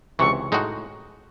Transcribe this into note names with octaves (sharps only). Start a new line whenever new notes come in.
C#2 C3 E3 C#6
A2 G#3 D#4 F#4